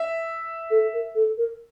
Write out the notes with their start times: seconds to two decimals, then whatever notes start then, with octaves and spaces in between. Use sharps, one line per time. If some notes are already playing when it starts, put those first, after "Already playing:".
Already playing: E5
0.71 A4
0.93 A#4
1.15 A4
1.38 A#4